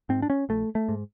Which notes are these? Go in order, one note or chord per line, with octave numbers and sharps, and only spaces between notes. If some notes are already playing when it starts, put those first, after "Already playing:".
G#2 C4
D4
C#4
A#1 A3
A3
G#2